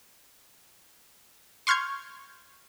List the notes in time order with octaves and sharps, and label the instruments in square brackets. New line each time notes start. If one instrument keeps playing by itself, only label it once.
[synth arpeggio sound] C6 C#6 F6 G6 G#6